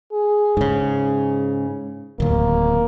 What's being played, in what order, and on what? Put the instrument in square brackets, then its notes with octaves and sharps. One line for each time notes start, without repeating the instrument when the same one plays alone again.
[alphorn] G#4
[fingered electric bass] G#2 C#3
[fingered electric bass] D1 D#2 [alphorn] A#3